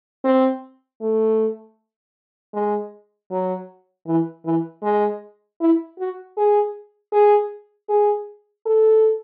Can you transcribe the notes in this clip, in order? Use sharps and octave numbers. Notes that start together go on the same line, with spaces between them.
C4
A3
G#3
F#3
E3
E3
G#3
E4
F#4
G#4
G#4
G#4
A4